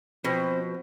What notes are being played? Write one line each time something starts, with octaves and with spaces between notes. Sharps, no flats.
B2 F3 C4 C5